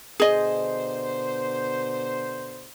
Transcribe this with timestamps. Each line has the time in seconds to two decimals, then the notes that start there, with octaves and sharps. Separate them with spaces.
0.20 B2 D3 G#4 C5 D#5